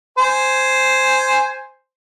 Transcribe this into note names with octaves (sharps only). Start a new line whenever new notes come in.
C5 G#5